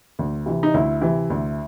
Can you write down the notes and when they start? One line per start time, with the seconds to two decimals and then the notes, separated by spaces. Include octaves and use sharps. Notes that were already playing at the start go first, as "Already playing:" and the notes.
0.19 D2
0.46 C3 E3
0.63 D#4
0.74 D2 E4
1.02 C3 E3
1.30 D2